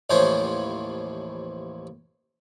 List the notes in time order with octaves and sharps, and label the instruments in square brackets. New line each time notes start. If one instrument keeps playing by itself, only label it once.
[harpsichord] A1 D#2 E3 F3 C5 C#5